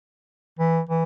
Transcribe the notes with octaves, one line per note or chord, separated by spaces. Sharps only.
E3
E3